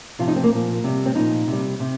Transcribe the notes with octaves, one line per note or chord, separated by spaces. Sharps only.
C3 F3 F4
D#4
C4
A#3
A#2 F3
C3 G3
C4
A#2 F3 D#4
C3
G3
C3